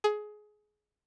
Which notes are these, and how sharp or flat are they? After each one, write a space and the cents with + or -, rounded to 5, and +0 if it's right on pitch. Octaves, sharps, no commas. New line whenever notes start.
G#4 +20